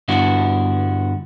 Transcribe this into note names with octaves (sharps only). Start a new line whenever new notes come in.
G2 D3 B3 D4 E4 F#4